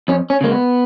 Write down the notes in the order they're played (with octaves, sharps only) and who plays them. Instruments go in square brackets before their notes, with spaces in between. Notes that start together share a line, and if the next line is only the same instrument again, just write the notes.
[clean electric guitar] F2 C#4
C#4
C#3 G#3 A#3
B3